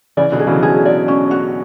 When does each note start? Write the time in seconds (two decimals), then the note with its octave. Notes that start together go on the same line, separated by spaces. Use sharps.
0.17 C#3 E3 D5
0.32 B2 D3
0.40 F#3 G#4
0.47 C#3 E3
0.62 D3 F#3 G#4
0.85 D5
1.08 C#4
1.31 F#4